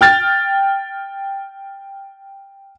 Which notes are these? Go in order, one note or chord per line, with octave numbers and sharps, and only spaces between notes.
G5 F6 A6